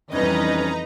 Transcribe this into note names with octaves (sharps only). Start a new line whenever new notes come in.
F2 E3 G3 C#4 D#4 B4 D#5 A#5